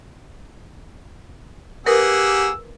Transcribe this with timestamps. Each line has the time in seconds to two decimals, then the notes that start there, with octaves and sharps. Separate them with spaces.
1.86 A#3 G4 G#4 A#4 B4 F#5 D#6 E6